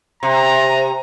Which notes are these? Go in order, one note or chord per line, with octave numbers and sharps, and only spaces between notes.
C3 A#5